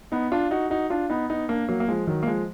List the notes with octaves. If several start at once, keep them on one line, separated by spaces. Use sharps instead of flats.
B3 D#4
D4 F4
D#4 F#4
D#4 F#4
D4 F4
B3 D#4
B3 D#4
A#3 D4
F#3 A#3
A#3
F3 G#3
D#3 F#3
A#3
F3 G#3